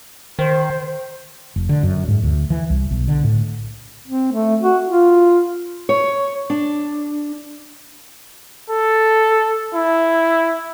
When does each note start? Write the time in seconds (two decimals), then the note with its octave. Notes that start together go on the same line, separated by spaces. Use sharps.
0.39 D#3 C5
1.56 F1
1.69 D3
1.83 F#2
2.08 G#2
2.23 D2
2.50 E3
2.70 C2
2.91 B1
3.08 D3
3.24 A2
4.07 C4
4.32 A3
4.62 F#4
4.87 F4
5.89 C#5
6.50 D4
8.70 A4
9.75 E4